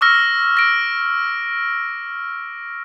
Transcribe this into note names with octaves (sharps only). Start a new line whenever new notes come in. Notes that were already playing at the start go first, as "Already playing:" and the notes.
C#6 D6 E6 F6 A#6
A#6 D7